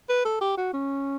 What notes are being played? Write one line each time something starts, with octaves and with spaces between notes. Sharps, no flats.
B4
A4
G4
F#4
C#4